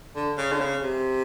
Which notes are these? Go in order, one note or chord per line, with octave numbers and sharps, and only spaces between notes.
D3
C#3
D3
C#3
C3